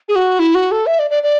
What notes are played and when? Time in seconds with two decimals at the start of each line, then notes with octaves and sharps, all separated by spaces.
0.09 G#4
0.16 F#4
0.39 E4
0.55 F#4
0.72 A4
0.86 E5
0.99 D5
1.11 D5
1.23 D5